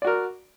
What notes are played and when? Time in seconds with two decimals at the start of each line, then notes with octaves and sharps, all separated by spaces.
0.02 D5
0.05 F#4
0.07 A#4